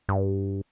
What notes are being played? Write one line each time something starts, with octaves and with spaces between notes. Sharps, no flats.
G2